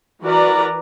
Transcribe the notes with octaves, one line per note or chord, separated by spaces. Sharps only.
E3 F#4 A#4 B4 D5 A#5